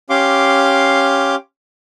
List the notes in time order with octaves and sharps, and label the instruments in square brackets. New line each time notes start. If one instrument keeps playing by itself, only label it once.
[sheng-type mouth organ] C#4 G4 F5 C6 D6